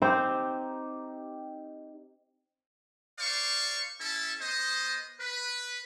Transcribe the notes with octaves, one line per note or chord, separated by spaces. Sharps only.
C4 D#4 G4 C5
C5 D5 F5 C#6
C#4 E4 A4 A5
B3 C5 D#5
B4